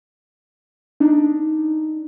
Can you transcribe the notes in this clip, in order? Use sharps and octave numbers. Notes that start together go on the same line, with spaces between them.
D4 D#4